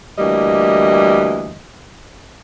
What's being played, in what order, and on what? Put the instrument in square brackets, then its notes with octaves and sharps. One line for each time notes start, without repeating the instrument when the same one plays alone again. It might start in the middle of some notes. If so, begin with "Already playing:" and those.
[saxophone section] D2 E3 G3 A#3 D#5